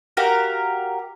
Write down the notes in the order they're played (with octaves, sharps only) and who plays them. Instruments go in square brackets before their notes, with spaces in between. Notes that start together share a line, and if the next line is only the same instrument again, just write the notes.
[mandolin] F#4 G4 A#4 F5